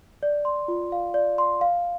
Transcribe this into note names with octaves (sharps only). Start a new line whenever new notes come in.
D5
C6
F4
F5
D5
C6
F5